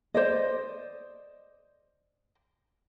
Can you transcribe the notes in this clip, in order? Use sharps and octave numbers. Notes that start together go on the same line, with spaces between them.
C5 D5 D#5